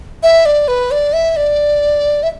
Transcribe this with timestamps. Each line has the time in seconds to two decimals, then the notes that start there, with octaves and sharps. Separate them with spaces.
0.23 E5
0.46 D5
0.68 B4
0.91 D5
1.13 E5
1.36 D5
2.23 E5